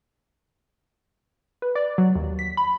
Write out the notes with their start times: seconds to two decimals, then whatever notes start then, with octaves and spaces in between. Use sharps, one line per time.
1.62 B4
1.75 D5
1.98 F#3
2.15 D#2
2.39 B6
2.57 B5